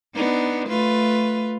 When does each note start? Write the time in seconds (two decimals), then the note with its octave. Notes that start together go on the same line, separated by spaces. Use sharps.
0.15 B3 D4 D#4
0.68 A3 F4 B4